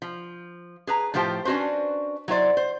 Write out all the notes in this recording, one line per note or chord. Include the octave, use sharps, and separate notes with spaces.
F3
G#4 B4 A#5
A2 F3 F4 G4 C5 G5
C#4 D4 F#4 B4 C5
F#3 E4 C5 D5
C5